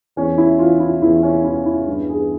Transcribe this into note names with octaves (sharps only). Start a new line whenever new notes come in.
E2 C#4
E4
E3 F4
E4
E2 E4
C#4
E3 E4
E4
G2
G#4